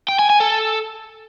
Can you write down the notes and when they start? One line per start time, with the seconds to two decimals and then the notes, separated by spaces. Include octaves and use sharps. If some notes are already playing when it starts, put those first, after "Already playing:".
0.08 G5
0.19 G#5
0.30 G#5
0.40 A4